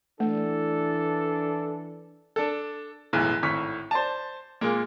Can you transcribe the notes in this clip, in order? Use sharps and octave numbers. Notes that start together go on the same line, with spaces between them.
E3 A3 D4 A4
D4 A4
B1 F#2 A2 E3 G#3
G#1 A2 C#6 F6 B6
C5 D5 A5
A#2 G#3 A#3